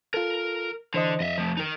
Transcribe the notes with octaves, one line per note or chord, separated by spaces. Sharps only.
F4 A4 A#4
D3 E3 C5 D#5
F2 D#5 E5
F3 A3
D#4 A#4